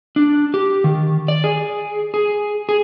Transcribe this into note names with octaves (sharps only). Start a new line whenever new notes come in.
D4
G4
D#3
D5
G#4
G#4
G#4